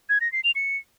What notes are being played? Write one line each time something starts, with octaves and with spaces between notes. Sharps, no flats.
G#6
A#6
C7
F7
C#7